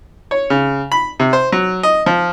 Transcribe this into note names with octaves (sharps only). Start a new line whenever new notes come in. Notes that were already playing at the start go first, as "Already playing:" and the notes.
C#5
C#3
B5
C3
C5
F#3
D#5
F3